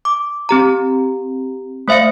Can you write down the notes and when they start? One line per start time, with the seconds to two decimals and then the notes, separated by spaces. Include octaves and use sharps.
0.05 D6
0.49 C4 G4 A#5
1.88 A3 C5 E5 F5 C#7